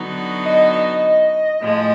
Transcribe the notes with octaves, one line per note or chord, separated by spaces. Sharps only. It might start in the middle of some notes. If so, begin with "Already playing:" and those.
Already playing: D3 F#3 B3 D#4 F#4
D#5
A2 F3 G#3